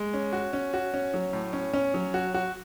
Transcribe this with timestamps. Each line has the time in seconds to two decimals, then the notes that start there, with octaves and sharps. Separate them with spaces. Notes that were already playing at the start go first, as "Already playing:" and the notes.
Already playing: G#3
0.14 C#4
0.33 F#4
0.53 C#4
0.74 F#4
0.94 C#4
1.14 F#3
1.33 A2
1.53 C#4
1.73 C#4
1.94 F#3
2.14 F#4
2.34 F#4